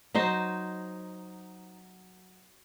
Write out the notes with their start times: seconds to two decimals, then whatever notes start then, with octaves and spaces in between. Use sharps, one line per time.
0.14 F#3 D#4 C5